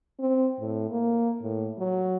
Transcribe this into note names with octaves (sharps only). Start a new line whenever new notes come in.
C4
A2
A#3
A2
F#3